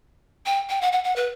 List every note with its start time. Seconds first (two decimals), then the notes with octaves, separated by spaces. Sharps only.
0.46 G5
0.69 G5
0.81 F#5
0.92 F#5
1.04 F#5
1.16 B4